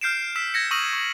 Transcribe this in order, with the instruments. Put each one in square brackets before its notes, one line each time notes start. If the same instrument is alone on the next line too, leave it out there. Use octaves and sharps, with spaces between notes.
[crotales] F6 G6 C7 D7 E7
E6 B6 E7
G#6 A#6 C#7
C#6 D#6 E6 A#6 D#7 F#7
C#6